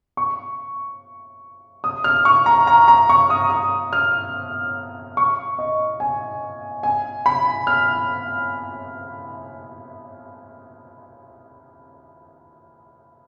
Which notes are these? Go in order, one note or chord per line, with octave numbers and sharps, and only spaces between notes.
C#6
D#6
F6
C#6
A#5
A#5
A#5
C#6
D#6
D#6
F6
C#6
D#5
G#5
G#5
B5
F6